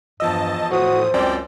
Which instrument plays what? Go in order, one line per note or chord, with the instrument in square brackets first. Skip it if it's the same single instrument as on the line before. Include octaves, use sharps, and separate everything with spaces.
[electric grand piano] E2 F3 E6 [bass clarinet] G2 [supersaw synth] D#5 A5
[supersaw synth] A2 D#6 [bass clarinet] F#4 [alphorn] C5
[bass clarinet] C#2 [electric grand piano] F#2 C4 [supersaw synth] D5 G5